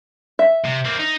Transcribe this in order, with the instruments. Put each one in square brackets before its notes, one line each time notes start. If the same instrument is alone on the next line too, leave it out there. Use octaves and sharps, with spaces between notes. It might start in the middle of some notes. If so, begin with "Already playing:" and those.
[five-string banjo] E5
[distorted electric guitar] C3
A#3 C4
D#4